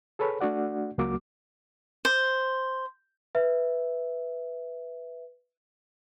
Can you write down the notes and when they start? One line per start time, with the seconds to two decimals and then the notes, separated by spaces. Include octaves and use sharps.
0.19 G#4 A4 B4 C#5 B5
0.41 A3 D4 F#4 D5 F#5
0.98 C#2 F#3 A#3 F#4 D6
2.05 C5
3.35 B4 E5